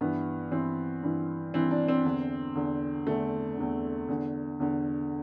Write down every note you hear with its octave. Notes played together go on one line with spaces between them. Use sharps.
G2 E3 B3
G2 E3 C4
G2 E3
G2 E3 C4
D4
C4
E2 D3
E2 D3
E2 D3 A3
E2 D3
E2 D3
E2 D3